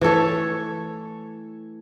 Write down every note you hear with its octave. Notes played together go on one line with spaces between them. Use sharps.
E3 A3 A4 C#5